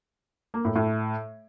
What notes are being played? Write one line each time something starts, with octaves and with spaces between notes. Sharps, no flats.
A#3
A2
A2